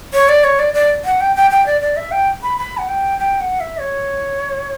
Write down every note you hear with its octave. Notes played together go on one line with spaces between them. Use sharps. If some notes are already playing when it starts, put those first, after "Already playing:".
C#5
D5
C#5
D5
D5
F#5
G5
G5
G5
D5
D5
E5
G5
B5
B5
F#5
G5
G5
F#5
E5
C#5